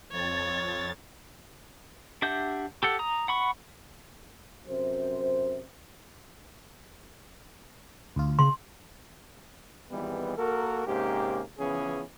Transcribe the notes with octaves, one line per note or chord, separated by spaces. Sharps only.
F2 C#5 A6
D4 G4 E5 F#5 G6
G4 A4 F#5
A#5 D#6
F#5 B5 C#6
F#2 C3 C5
D2 F4
C#3 C6
G#1 E3 G3 G#3 B3
A#3 F#4 A4 A#4
G#2 C3 A#3 C#4 G4
C#3 E3 F3 B3 C#4 G#4